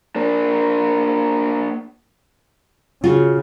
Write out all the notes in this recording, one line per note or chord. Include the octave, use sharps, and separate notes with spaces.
A#3 D4
C#3 F4 F#4